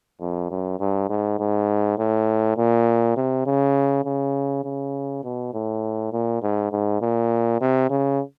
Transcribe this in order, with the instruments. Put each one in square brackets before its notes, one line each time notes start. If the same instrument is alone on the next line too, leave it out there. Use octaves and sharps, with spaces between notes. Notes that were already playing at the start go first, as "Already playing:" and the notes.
[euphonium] F2
F#2
G2
G#2
G#2
A2
A#2
C3
C#3
C#3
C#3
B2
A2
A#2
G#2
G#2
A#2
C3
C#3